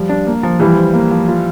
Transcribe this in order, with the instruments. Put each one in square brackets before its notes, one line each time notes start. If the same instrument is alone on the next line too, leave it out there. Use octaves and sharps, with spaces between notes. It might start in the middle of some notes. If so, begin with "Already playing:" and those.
Already playing: [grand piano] F3 G3
D4
A#3
F3
[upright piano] E3 G3 [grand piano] F3
[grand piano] C5
A#3
F3
F4